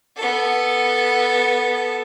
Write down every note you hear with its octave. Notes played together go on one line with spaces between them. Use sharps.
B3 A4